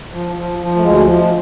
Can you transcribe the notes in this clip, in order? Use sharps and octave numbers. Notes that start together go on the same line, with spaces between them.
F3
F3
F3
A3
D2 G#3
F3